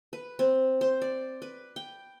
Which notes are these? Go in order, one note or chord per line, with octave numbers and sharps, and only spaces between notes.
B4
C4
C5
D5
B4
G5